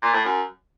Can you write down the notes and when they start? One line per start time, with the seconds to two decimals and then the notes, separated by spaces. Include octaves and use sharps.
0.02 A#2
0.14 A2
0.25 F#2